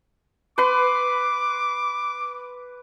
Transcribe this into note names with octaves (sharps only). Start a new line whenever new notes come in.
B4 C6 D6